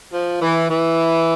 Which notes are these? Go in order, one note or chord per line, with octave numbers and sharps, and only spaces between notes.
F3
E3
E3